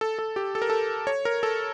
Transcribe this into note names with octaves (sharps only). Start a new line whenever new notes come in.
A4
A4
G4
A4
A#4
A4
C#5
A#4
A4